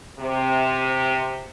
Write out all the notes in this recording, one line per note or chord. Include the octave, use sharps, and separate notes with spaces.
C3